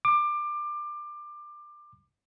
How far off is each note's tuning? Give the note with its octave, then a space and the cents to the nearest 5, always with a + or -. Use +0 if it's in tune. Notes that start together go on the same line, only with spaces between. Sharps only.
D6 +20